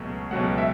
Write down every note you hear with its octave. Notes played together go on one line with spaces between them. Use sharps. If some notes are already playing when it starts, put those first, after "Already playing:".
Already playing: C#2 B2 F#3 A3
C#2 B2 F#3 A3 F#5
E5